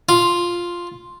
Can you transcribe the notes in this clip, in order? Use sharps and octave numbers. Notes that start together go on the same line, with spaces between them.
F4